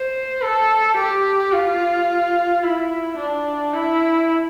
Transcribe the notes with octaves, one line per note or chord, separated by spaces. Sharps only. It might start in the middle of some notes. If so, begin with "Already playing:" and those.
Already playing: C5
A4
G4
F4
E4
D4
E4